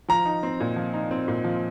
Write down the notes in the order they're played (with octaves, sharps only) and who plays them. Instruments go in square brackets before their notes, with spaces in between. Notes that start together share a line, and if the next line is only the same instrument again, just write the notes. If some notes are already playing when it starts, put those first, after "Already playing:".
[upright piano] F3 [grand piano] A#5
[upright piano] D#4
C4
A#2
F3
D#4
C4
A#2
F3